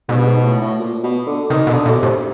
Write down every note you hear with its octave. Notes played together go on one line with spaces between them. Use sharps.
G#2 B2
G2
G#2
A2
A2
A#2
B2
D3
C3 D#3
B2
D3
A#2
B2
C3
A2